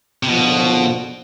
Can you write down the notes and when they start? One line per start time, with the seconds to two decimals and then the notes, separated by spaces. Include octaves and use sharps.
0.23 C3
0.28 F#1 F2 B2 D3 F3